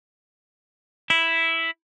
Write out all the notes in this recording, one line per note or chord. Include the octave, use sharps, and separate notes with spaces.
E4